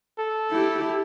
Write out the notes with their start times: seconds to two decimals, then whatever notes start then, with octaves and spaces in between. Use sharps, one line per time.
0.19 A4
0.52 E4 G4